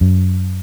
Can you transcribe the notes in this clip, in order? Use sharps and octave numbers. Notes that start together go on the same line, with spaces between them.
F#2